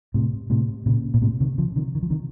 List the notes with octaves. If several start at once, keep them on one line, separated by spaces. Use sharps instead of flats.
A2 C3
A2 C3
A#2 C#3
A#2
A2 C3
C3 D#3
C#3 F3
C3 D#3
D#3
F3
C3 D#3